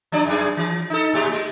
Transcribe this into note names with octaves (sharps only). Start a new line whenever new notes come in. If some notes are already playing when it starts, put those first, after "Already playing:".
F3 D4 D5
F#2 D4 G#4
E3
D#4 A4
A2 G4 G#4
G#3